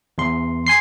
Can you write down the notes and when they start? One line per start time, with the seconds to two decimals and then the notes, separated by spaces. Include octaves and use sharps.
0.18 E2 C6
0.67 G#5 C6 C7